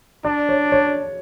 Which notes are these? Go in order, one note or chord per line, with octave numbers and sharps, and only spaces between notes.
D4 D5
C#5
C#5